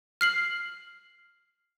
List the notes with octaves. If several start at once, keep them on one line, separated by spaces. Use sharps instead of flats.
F6 C7 F#7